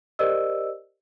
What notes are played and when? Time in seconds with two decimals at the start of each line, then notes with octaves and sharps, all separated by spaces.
0.19 G4 A#4 C5 D5 D#5 E6